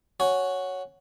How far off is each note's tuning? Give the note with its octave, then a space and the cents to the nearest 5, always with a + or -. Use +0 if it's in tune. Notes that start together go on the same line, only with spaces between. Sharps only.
F#4 +0 C#5 +0 G#5 +0